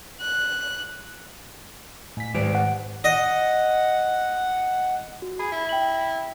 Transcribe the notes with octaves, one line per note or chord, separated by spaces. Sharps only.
F#6
A2 B6
G#2 D#3 G4 C5 D5 D7
F#5
D#5 F#5
F#4
G#4 B5
E4
G5 F#7